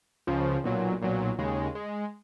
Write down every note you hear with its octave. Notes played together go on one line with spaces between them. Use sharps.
C#2 C#3 F3
B1 A#2 F#3
B1 A#2 F#3
D#2 C#3 G#3
G#3